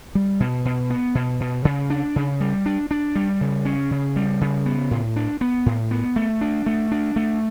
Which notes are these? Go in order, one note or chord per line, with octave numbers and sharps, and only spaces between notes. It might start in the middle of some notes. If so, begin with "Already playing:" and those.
G3
B2
B2
B3
B2
B2
C#3
D4
C#3
G3
D4
D4
G3
C#3
C#4
C#3
G3
C#3
B3
A2
D4
B3
A2
B3
A3
D4
A3
D4
A3